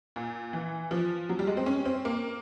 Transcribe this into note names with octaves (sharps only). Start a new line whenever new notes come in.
A#2
E3
F3
F#3
G3
G#3
C4
C#4
C4
A#3